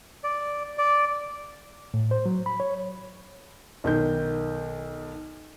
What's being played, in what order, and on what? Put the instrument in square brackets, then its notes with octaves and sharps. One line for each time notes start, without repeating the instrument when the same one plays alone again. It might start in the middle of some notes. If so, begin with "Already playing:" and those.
[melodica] D5
D5
[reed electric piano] A2
C5
F#3
B5
C#5
[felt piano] B1 D#3 G6